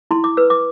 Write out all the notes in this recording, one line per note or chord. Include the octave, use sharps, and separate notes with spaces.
E4 C6
D6
B4 E6
D6